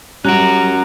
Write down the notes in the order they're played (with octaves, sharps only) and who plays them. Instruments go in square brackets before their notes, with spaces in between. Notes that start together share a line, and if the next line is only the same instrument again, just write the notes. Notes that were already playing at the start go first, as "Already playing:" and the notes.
[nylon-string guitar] G3 [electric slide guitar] C#4 F#4 [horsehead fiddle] A#5 [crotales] F#6 D7